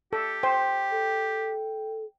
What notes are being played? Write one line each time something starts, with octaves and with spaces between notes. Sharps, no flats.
G4 A4
C5 G5
A4